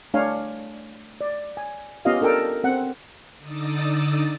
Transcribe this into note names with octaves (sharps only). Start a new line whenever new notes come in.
A3 D4 C#5 F5 G#5
D5
G#5
B3 C#4 F4 G4 D#5 F5
D4 A4 A#4 G5 A5
C4 F#5
D3 D#4 D5 D#6 E6 A6